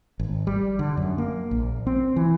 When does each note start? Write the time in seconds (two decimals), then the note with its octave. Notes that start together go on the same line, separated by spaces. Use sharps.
0.19 G#1
0.47 G3
0.79 D3
0.97 F#2
1.18 A#3
1.51 A#1
1.87 C4
2.16 E3